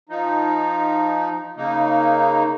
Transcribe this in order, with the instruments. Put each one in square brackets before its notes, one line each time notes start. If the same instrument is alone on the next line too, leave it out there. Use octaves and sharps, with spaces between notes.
[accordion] F3 D#4
C#3 A#3 D#4